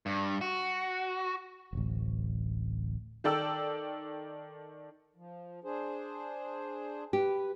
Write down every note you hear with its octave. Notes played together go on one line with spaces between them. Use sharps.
G2
F#4
D1 A1
D#3 A4 D5 G5 E6
F3
D4 G#4 C5
G4 B4